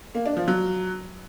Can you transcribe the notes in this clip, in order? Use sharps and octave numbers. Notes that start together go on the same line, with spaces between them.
A#3
D4
F3
F#3